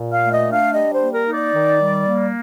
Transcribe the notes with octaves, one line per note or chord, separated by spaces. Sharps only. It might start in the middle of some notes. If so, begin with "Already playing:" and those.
Already playing: A#2
F5
A3
D#5
D4
F5
G3 D#5
C5
A#3
A#4
D#4
D5
D#3
G3
A#3